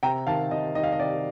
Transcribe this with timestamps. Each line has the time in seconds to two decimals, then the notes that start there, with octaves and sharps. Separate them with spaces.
0.03 C3 G5 A#5
0.27 D#3 F5 A5
0.51 C3 D#5
0.75 D#3 D#5
0.83 F5
0.92 D#5
0.99 C3 D5